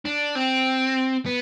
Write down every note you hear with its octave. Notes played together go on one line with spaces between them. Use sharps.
D4
C4
B3